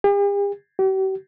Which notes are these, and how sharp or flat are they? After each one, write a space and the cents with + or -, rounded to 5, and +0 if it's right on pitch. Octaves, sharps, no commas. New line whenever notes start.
G4 +45
G4 -45